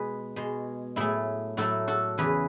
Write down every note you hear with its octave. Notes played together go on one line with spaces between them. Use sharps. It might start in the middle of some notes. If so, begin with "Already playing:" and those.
Already playing: B2 G#3 G#4 B4
B2 G#3
A2 F#3 A3 E4 G#4
A2 F#3 A3 F#4 A4
F#4 A4
E2 C#3 E3 G#4 B4